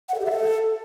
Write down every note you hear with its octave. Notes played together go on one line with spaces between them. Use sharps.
F#5
A4
G4
E5
A4